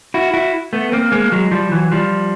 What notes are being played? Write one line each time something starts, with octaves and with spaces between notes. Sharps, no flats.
E4 F#4
E4 F#4
A3 B3
A#3 C4
G#3 A#3
F#3 G#3
F3 G3
E3 F#3
F3 G3